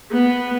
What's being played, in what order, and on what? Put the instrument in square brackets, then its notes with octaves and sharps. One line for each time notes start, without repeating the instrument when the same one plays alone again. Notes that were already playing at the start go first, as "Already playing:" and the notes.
[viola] B3